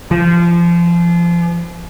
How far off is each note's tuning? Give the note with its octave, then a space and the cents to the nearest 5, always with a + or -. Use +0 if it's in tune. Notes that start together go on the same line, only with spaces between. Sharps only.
F3 -25